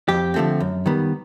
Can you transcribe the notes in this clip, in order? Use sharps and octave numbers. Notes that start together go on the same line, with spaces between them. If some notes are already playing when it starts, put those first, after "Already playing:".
F2 G4
D3 F3 A3 C4
F#2
D#3 G3 B3